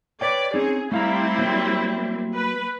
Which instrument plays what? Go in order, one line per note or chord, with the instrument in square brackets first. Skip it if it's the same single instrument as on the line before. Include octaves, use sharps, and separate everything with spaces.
[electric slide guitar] B4 C#5 G5 [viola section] D5
[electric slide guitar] C4 C#4 D#4 [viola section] G#4
[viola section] G3 C4 E4 [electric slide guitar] A3 F5 A#5
[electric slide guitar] F#3 A#3
[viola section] B4